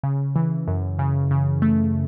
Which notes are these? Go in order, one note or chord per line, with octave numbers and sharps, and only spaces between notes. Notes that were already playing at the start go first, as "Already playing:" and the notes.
C#3
E3
F#2
C#3
C#3
A3